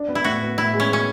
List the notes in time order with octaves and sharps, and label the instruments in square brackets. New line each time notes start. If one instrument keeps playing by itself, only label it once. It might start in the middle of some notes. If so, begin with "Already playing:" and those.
Already playing: [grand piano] D4
B3
[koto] E4
[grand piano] A2 [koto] F#4
[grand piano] B3
[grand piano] A2 [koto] E4
[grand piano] G#3
[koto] C#4
[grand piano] B3 [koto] C#4